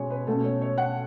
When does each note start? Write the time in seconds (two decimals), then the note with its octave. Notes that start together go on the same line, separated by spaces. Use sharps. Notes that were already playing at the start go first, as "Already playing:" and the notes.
Already playing: B2 G#3 C#4 C#5 G#5
0.10 B4
0.27 B2 A3 C#4 A4
0.44 C#5
0.62 C#5
0.78 F#5